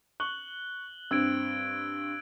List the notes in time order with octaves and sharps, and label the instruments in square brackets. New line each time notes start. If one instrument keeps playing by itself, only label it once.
[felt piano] C#6 [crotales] F#6 F#7 G7
[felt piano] G2 C4 [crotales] E6 G#6 D7